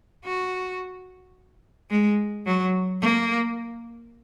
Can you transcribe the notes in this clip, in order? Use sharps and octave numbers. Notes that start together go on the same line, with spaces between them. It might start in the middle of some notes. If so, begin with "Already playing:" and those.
F#4
G#3
F#3
A#3